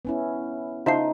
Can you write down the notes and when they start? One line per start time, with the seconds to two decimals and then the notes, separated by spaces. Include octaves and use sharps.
0.05 B3 C#4 E4
0.86 C#3 D#4 F4 C5 E5 A5 C7